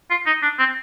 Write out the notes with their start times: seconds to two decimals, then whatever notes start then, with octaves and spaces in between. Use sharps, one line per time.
0.10 F4
0.26 D#4
0.43 D4
0.59 C4